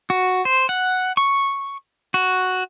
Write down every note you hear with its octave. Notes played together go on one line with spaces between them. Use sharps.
F#4
C5
F#5
C#6
F#4